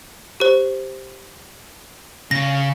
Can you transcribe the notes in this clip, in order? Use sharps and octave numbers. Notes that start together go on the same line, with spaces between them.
G4 C5
C#3 A#6